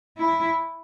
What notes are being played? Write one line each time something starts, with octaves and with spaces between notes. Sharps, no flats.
E4